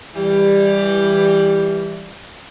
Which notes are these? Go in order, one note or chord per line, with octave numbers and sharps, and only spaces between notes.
E3 G3